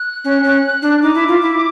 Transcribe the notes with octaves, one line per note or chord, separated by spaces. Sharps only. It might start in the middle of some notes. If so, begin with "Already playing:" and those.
Already playing: F#6
C#4
C#4
D4
D#4 D6
E4
F4
E4